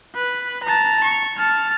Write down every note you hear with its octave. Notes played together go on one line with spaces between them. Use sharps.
B4
A5 A#5
C#6
A5 F6